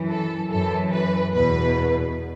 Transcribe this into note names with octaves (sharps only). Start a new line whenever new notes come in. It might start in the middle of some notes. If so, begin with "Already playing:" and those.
Already playing: F#2 E3
A4
F#2 E3 A4
B4
E2 B2 B4